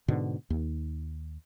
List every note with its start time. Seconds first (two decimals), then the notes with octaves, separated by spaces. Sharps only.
0.08 G#2 B2 D3
0.50 D#2